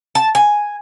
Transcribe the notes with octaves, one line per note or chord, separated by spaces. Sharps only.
A5
G#5